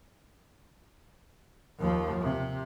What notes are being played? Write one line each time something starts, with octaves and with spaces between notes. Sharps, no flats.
D#2 F3
C3